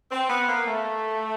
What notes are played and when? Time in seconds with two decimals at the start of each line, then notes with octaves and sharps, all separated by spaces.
0.10 C4
0.28 B3
0.47 A#3
0.66 A3